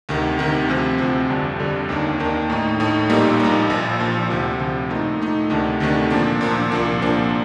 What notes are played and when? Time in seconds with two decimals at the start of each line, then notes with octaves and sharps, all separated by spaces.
0.09 D2 C3 D#3
0.39 D2 C3 D#3
0.68 D2 C3 F3 C4
0.99 D2 C3 F3 C4
1.29 G1 F2 D3 G3 D4
1.59 G1 F2 D3 G3 D4
1.89 D#2 D#3 A#3 D4
2.20 D#2 D#3 A#3 D4
2.50 A2 A3 D#4
2.80 A2 A3 D#4
3.10 A#1 A#2 G3 A#3 D#4
3.40 A#1 A#2 G3 A#3 D#4
3.70 A#1 A#2 F3
4.00 A#1 A#2 F3
4.30 D2 C3 F3
4.60 D2 C3 F3
4.90 A#2 A3 D#4
5.20 A#2 A3 D#4
5.50 D2 C3 D#3 A3 D4
5.80 D2 C3 D#3 A3 D4
6.10 A#2 F3 A#3 D4
6.41 A#2 F3 A#3 D4
6.71 C2 A#2 F3 A#3 D4
7.01 C2 A#2 F3 A#3 D4